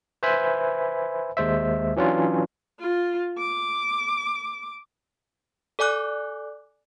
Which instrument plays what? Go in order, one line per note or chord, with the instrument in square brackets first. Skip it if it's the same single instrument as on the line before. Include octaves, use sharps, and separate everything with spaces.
[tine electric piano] B4 C5 E5 G#5 B5
D#2 G#3 C5 E5
E3 F#3 C#4 D4 F4
[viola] F4
D6
[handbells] A4 D5 G#5 D6 F#6